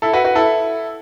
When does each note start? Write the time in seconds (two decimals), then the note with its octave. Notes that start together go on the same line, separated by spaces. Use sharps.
0.02 E4 A4
0.13 F#4 B4
0.24 F#4 B4
0.35 E4 A4